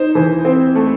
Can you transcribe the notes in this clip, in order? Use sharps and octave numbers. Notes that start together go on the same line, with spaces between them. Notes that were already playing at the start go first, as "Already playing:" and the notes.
Already playing: D#4 C5
E3
C4
A3